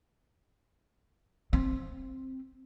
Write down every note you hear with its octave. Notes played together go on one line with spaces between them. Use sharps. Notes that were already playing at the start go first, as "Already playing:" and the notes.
C4